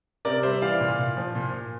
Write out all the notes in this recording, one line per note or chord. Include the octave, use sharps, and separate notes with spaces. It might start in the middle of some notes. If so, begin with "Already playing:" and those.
C3 A#4 D5
G3 C5 E5
E3 D5 F5
A#2
A#2
F3
A#2
A#2